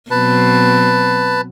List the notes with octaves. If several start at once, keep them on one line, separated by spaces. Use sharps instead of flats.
B2 F#3 C4 B4 A5